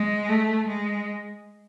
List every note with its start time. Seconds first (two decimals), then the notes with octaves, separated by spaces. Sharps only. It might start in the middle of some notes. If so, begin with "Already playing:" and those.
Already playing: G#3
0.29 A3
0.68 G#3